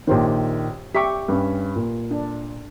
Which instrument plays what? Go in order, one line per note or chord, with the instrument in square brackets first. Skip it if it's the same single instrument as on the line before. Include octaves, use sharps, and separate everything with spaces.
[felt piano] A#1 D#3 [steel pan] G4 C5 C#5
[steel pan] G4 E5 C#6 [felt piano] D6 B6
[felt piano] G2 C#4
A#2
[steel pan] D4